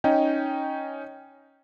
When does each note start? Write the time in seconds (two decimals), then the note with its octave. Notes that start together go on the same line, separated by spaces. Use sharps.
0.04 C#4 D#4 D#5 G5